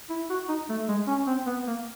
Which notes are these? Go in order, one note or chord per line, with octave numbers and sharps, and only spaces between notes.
E4
F#4
D#4
A3
G#3
C#4
C4
B3
A#3